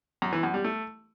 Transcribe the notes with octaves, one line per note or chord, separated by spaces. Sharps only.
F#2
E3
F#2
G3
A3